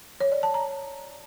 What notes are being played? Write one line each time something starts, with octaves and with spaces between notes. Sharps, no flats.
C#5
D5
A5
A#5